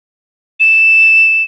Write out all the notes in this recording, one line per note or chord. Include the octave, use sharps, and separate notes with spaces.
E7